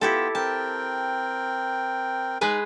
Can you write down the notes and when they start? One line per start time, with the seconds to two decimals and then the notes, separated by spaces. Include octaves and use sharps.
0.01 B3 E4 F4 G4 A4 G5
0.35 C4 A#4 G5 A5
2.41 G#3 D#4 G#4 B4